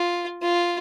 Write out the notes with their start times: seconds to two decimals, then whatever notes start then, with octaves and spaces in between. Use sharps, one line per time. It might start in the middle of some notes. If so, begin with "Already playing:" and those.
Already playing: F4
0.42 F4